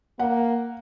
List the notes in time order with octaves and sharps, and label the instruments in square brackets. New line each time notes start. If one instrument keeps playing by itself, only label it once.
[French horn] A#3 [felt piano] F#5